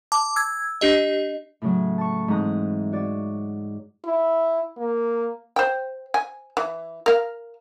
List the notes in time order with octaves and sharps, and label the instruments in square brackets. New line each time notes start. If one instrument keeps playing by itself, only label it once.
[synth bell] A5 D6
E6 G#6
D4 G4 D#5
[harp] A2 C#3 F#3
A5 C#6
G#2 E3 C4 A#5 D#6 F#6
F#4 C#5 D5
[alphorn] E4
A#3
[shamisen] C5 G5
G#5
E3
A#4 F5